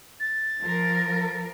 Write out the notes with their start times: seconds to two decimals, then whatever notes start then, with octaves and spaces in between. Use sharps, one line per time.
0.20 A6
0.61 F3 A#4